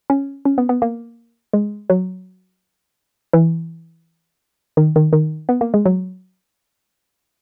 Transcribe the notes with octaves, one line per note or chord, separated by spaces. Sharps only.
C#4
C#4
B3
B3
A#3
G#3
F#3
E3
D#3
D#3
D#3
B3
A#3
G#3
F#3